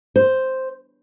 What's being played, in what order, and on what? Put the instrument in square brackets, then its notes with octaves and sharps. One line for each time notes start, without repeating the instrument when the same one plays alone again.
[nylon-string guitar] C5